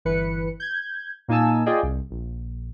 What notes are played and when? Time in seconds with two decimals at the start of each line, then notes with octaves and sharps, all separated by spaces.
0.05 G1 E3 B4 C#7
0.60 G6 G#6
1.28 A#2 A#3 D#4 G#5 A5 E6
1.66 F4 G#4 D5 D#5 G5
1.83 C2
2.10 A#1